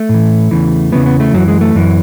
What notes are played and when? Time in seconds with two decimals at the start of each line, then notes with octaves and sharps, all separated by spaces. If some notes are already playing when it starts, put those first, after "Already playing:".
Already playing: A3
0.09 A2
0.14 E3
0.51 E2 C#3 E3
0.92 E2 C#3 E3 B3
1.06 B3
1.20 A3
1.33 F#2 E3 F#3
1.48 G#3
1.61 A3
1.75 F#2 E3